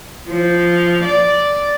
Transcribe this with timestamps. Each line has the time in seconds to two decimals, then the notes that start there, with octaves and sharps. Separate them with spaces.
0.29 F3
1.04 D5